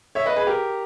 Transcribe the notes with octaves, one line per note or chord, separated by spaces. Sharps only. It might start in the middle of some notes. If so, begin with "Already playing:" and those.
C#5 E5
B4 D#5
G#4 B4
G4 A#4